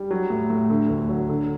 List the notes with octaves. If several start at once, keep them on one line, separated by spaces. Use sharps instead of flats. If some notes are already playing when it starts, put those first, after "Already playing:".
Already playing: G3
F#3
A2
A2
D3
D2
F#3
D3